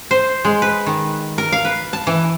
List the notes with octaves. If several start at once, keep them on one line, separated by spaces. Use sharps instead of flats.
C5
G#3
B4
D#3
A#4
F5
B4
A5
E3